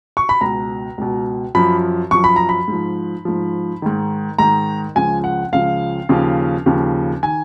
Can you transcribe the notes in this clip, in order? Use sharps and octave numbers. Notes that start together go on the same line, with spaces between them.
C#6
B5
C#2 B2 A#5
C#2 B2
F#2 F3 B5
F#2 F3 C#6
B5
A#5
B5
G#2 F3
G#2 F3
G#2 D#3
G#2 D#3 A#5
C#2 C#3 F3 G#5
F#5
C#2 C#3 F3 F5
D#2 C#3 F3
D#2 C#3 F3
D#3 G#5